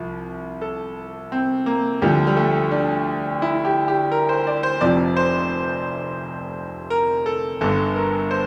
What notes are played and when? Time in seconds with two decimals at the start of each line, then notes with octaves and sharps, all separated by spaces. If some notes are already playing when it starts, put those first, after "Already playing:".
Already playing: C2 F3
0.62 A4
1.32 C4
1.66 A#3
2.02 D2 D3 F3 G3
2.27 G3
2.36 A3
2.71 D4
3.42 E4
3.65 G4
3.88 G4
4.12 A#4
4.29 C5
4.47 D5
4.63 C5
4.81 F1 F2 C3 F3 D5
5.17 C5
6.90 A#4
7.26 A4
7.61 G1 G2 D3 A4
7.96 A#4
8.31 C5